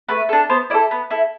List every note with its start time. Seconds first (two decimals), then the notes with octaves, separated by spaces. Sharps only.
0.09 A3 B4
0.29 D4 A4
0.49 B3 C5
0.70 E4 D5
0.74 A4
0.91 B3
1.11 E4 A4